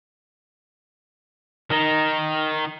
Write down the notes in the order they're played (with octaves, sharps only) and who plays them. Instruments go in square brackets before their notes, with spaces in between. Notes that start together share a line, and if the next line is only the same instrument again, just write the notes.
[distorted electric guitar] D#3 D#4